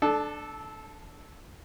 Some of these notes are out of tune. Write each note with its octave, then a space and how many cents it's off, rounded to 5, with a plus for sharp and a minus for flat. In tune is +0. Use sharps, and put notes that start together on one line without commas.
D4 +15 A4 -15